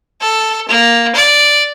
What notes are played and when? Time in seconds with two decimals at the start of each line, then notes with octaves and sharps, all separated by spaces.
0.21 A4
0.68 A#3
1.15 D5